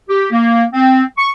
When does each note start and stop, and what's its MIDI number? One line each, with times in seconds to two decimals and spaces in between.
0.09 0.27 67
0.32 0.64 58
0.73 1.03 60
1.18 1.30 85